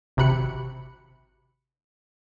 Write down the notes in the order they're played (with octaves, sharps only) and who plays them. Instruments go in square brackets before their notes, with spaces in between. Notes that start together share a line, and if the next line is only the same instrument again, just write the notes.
[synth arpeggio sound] G#1 C3 F#4 B5 F#6 C#7